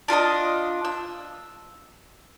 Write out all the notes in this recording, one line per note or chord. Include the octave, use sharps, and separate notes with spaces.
D4 F4 A4 D#5
E6